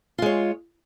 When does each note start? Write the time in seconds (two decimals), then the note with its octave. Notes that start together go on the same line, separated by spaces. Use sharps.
0.18 F4
0.22 G#3
0.26 C#5